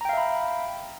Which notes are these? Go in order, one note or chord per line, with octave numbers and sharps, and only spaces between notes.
E5 F5 G5 A#5 B5